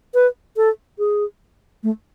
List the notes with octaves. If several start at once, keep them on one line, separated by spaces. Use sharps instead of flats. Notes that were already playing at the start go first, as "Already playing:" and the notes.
B4
A4
G#4
A3